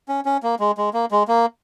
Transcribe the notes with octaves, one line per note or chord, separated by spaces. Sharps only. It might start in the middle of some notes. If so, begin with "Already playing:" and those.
C#4
C#4
A#3
G#3
G#3
A#3
G#3
A#3